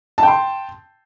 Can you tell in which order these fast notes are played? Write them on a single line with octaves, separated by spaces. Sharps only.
A5 G5 C6